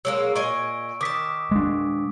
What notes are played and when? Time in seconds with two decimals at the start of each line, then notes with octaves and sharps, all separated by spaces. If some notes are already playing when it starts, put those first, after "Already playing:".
0.05 F#3 G#3 A#3 E6
0.35 A#2 D#5 G#5 C#6 D7
1.01 D#3 A5 D6 D#6 B6
1.51 G#3 D4